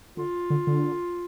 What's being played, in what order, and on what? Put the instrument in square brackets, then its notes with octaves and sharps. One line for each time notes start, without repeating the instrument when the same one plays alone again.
[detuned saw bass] D3 [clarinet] F4
[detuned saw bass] D3
D3